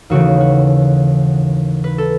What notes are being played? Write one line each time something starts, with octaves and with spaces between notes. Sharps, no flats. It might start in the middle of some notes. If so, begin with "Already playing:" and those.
D#2 C#3 E3 A3 F#4
F#4
B4
A4